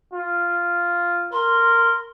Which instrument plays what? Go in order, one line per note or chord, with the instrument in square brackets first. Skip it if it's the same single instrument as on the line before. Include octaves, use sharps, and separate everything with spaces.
[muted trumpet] F4
[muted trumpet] A#4 [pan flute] C6